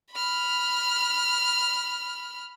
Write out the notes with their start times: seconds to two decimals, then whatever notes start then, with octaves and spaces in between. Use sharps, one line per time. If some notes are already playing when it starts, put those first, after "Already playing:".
0.12 B5 F6